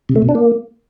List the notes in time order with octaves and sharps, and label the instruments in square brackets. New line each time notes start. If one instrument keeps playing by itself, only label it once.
[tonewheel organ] C3
A3
B2
D4
A#3